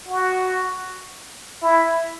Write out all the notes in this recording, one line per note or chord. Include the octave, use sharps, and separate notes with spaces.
F#4
E4